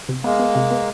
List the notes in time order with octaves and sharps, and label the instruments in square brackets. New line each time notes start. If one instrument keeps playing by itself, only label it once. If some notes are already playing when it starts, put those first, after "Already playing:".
[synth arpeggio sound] C3
[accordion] G#3 A#3 [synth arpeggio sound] B3
[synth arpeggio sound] B3
C3
B3